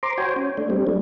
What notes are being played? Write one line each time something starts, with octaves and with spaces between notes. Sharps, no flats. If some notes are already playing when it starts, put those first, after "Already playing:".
C5 A#5 C6 D6
F#4 C5 C#5 G5 G#5
C#4
A3 D4
G3 C4
F#3 A3 D4